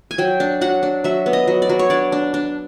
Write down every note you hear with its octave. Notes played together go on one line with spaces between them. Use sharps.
G#5
F#3 G5
D4
F#3 F#5
D4
F#3 E5
B3
D#5
F#3
D5
F#3
C#5
D4 D5
D4
D4